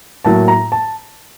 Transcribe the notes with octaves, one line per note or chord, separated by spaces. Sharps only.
A2 F#3 A#3 A5
A#5
A5